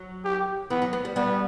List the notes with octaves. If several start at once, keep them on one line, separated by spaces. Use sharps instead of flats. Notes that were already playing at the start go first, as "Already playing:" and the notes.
Already playing: F#3
G4
E3 B3
F#3
B3
G3
G3 B3